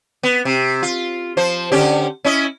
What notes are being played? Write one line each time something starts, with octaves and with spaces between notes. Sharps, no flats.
B3
C3
F4
F3 C5
D3 C#4 G4
C#4 E4 D#5